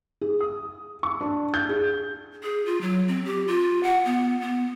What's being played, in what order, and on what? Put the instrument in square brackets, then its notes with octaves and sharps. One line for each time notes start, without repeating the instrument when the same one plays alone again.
[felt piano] G#4
D#6
C#6
D4
G6
G#4
[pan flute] G#4
F4
F#3
C4
G4
F4
F#5
B3
B3